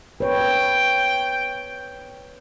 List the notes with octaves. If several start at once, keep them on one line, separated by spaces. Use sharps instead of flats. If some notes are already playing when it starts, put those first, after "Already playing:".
B4 C#5 G5